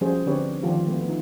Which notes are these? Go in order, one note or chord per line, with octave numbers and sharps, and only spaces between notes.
F3 G3 C#4 F#4 G#4 C5
D3 C4 D4 G4 B4 C#5
D#3 F3 A3 F4 G4
A3 B3
F3 D#4 F4